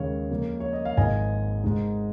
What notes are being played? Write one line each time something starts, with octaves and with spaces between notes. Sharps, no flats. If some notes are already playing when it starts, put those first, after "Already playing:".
Already playing: D#2 C#3 G#3 C#5 F5
F2 C#3 A#3
C#5
D#5
F5
G#1 G#2 F3 D#5 G#5
G#2 G#3 D#4